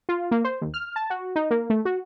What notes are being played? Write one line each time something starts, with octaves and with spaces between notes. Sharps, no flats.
F4
A#3
C5
D#2
F6
A5
F#4
D#4
A#3
A3
F#4